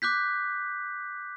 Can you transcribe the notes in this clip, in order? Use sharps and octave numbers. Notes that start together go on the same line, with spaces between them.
D6 F#6 G6 B6